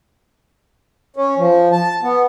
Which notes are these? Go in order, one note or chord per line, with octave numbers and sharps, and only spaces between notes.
C#4
F3
A5
B3